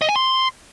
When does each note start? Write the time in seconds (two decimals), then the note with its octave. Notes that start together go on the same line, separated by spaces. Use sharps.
0.02 D#5
0.09 G#5
0.16 C6